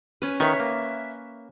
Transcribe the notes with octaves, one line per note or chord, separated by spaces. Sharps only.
C#4 B4
D#3 B4 C#5 E5
A#3